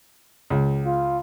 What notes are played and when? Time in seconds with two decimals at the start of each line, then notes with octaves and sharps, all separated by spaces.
0.50 C#2
0.85 F4